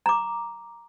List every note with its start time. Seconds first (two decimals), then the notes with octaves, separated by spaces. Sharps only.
0.06 A#5 D6